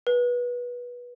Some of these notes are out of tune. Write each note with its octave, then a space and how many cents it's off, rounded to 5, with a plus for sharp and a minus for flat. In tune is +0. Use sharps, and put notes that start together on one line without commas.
B4 -20